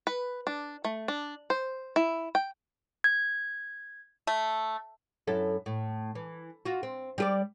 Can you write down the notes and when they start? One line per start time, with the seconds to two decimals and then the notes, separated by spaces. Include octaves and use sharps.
0.07 B4
0.47 D4
0.84 A3
1.08 D4
1.50 C5
1.96 E4
2.35 G5
3.04 G#6
4.27 A3
5.27 F#2 E4 A4
5.66 A2
6.15 E3
6.65 F4 F#4
6.83 C4
7.18 G3 G4 D5